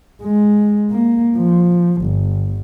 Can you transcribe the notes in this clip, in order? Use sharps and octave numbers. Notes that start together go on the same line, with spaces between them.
G#3
A#3
F3
G1